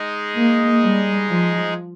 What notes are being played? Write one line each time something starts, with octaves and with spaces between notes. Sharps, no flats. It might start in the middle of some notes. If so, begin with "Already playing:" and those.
Already playing: G#3 D#4 G#4
A#3
G3
F3